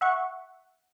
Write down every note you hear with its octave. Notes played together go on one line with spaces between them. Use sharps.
E5 F#5 C#6